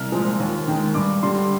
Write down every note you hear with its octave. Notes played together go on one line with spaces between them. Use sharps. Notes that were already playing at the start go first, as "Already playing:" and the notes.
Already playing: C2 F6
A#2 F3 G#3
D#2
D#3 G#3
G2 D6
D3 G3 C6